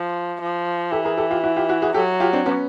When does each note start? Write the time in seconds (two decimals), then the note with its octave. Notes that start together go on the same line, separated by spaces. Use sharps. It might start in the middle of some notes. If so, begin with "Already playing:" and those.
Already playing: F3
0.41 F3
0.92 E3 G4 A4
1.04 G#4 A#4
1.18 G4 A4
1.31 F4 G4
1.44 E4 F#4
1.56 F4 G4
1.69 E4 F#4
1.82 F#4 G#4
1.94 F#3 G4 A4
2.20 F4 G4
2.33 C4 D4
2.46 B3 C#4